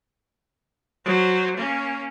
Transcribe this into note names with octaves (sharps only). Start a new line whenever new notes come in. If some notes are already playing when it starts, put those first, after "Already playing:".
F#3 C5
A#3 C#4